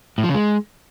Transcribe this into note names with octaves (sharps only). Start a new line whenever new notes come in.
A2
F3
C#3
G#3